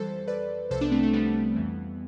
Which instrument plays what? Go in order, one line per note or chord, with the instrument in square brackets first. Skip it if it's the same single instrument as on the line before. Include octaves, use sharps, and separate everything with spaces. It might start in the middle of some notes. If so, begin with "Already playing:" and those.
Already playing: [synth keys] F2 E3 G3 A4 C5
B4 D5
C2 C3 F3 A4 C5
B3 D4
A3 C4
A3 C4
G3 B3
F2 E3 G3